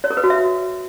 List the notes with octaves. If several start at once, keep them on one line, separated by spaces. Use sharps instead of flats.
C#5
A#4
B4
F#4
E5